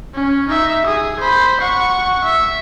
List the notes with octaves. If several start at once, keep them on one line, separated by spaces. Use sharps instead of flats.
C#4
D#4 E5
G#4 D#6
C5 B5
F#5 C#6
E5